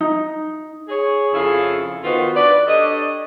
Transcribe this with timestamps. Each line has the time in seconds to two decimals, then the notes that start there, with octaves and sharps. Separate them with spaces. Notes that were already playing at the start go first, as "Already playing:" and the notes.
0.01 D#4
0.89 G#4 C#5
1.33 F2 C#3 E4 G#4 A4 F5
2.04 D#3 B3 F4 F#4 B4 C5
2.35 B4 D5
2.66 D4 G4 A4 C#5 D#5